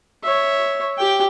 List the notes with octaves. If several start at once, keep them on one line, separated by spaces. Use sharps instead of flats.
C#5 E5
G4 G5